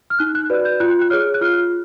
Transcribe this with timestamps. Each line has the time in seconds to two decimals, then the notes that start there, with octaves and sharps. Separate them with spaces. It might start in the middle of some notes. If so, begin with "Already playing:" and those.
0.10 F6
0.19 D#4 F#6
0.35 F#6
0.50 F#4 B4 D5
0.65 G6
0.80 F4 F#6
1.01 F#6
1.10 G#4 C#5 F6
1.34 F#6
1.41 F4 F6